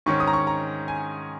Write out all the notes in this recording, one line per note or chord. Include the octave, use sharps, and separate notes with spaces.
G#2 D#3 C#4 C#6
D#6
A#5
C#6
A#5
G#5